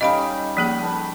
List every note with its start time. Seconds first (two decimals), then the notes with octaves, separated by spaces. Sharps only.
0.01 G3 C#4 D#4 D#5 F5 B5
0.57 F3 A#3 G#4
0.82 B4 A5